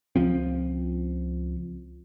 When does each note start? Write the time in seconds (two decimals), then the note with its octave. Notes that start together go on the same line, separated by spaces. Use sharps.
0.16 C#2 F3 C4